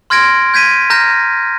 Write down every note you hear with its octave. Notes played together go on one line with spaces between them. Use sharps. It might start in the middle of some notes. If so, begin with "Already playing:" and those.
C6 F6 G#6 A#6 D7
G6 G#6 B6 D#7
A#5 F6 G6 A#6